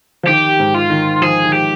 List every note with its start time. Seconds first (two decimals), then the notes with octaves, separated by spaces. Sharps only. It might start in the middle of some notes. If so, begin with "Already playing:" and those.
0.23 F3
0.27 D#3 G4
0.59 G#2
0.75 F4
0.90 D#3
1.22 F3 G#4
1.45 D#3
1.52 G4